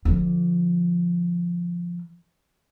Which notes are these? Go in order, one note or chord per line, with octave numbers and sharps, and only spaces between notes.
D3 F3